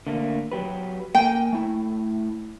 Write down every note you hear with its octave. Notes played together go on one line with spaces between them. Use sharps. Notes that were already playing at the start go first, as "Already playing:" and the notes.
D3 A3 A#3
F#3 G4 B4
A#3 G5 G#5
A3 E4